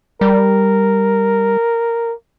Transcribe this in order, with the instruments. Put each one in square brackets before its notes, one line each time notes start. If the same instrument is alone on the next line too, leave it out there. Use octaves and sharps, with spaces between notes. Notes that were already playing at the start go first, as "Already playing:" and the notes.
[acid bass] G3 [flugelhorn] A#4